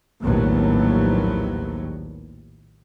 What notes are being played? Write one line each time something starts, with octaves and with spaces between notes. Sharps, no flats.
A#1 D#2 A2 F#3 B3